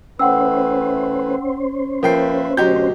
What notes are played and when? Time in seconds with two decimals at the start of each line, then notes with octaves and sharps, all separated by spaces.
0.19 E3 A3 C#4 B4 C5 F#5 G5 E6
2.03 F3 A#3 A#4 B4 E5 G5 C7
2.57 D2 B2 F#3 F#4 G4 D#5 G6